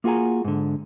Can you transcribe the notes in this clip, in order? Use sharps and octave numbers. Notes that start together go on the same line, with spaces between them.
A#3 F4 F#4 G#4 G#5 A#5
G#2 D3